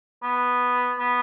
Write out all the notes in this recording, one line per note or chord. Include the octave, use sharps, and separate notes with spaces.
B3
B3